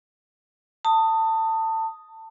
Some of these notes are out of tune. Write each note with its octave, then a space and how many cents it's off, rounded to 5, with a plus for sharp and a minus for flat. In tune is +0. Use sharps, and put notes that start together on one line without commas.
A5 +25 D#6 +0